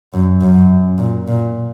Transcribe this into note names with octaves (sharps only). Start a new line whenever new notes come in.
F#2
F#2
A#2
A#2